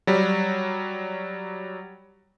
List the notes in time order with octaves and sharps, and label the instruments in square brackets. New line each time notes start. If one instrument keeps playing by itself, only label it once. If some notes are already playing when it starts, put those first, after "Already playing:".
[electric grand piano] F#3 G3